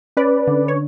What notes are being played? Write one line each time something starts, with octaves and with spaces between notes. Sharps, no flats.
C#4 B4 D5
D3
C#5